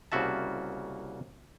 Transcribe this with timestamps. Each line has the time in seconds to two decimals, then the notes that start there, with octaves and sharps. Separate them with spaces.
0.12 C2 C#3 A#3 F#4 E5 A5